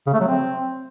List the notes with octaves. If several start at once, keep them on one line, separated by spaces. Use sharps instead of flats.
C#3
A3
F#3
C4